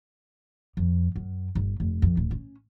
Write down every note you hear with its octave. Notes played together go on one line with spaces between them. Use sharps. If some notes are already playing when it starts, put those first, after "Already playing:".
F2
F#2
G1
F1
F2
D1
C#4